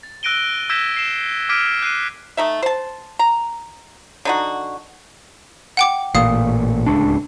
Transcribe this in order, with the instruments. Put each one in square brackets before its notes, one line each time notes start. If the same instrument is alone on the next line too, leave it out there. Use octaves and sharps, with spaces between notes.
[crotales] A6
E6 F#6 A#6 D7 D#7 G7
E6 G6 G#6 A#6 B6 E7
C7 E7
D6 F6 G#6 B6 D7 D#7
F#6 C7 D#7
[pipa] A3 D#4 E5
C5 A5
A#5
D3 D#4 F#4
[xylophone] F#5 G5 D6
[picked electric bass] A1 A#2 [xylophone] F5 D#6
[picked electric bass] D1 C#2 D4